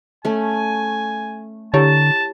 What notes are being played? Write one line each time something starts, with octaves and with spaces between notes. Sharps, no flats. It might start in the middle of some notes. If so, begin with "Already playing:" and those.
A3 C#4 G#5
D3 E4 G4 C#5 A5